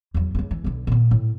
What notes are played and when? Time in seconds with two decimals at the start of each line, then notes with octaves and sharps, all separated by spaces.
0.14 E2 F#3
0.35 E1 C#2
0.51 E3
0.64 B1 D3
0.87 A#2 B3
1.11 A2